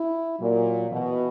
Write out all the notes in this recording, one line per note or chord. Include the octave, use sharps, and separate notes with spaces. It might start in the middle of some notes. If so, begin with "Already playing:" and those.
Already playing: E4
A#2 F#3
B2 E3